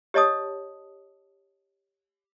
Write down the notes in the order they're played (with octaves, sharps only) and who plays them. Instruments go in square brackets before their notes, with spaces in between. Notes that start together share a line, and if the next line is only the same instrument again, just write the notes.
[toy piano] G4 C#5 D#5 A5 D#6